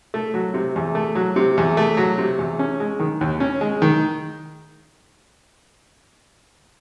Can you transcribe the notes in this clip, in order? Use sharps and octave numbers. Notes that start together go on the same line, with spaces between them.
A3
F#3
C3
E2
A3
F#3
C3
E2
A3
F#3
C3
E2
C#4
G#3
D#3
D#2
C#4
G#3
D#3